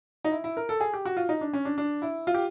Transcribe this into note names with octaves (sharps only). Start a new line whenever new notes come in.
D#4
E4
E4
A#4
A4
G#4
G4
F#4
F4
D#4
D4
C#4
D4
D4
E4
F4
G4